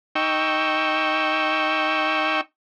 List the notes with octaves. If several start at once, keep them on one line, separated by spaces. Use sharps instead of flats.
D#4 G5 C#6 E6